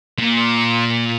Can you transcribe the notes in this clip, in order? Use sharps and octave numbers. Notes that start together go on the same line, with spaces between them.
A#2